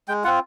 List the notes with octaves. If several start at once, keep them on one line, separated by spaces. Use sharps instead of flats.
G#3 G5
C4 F4 F#5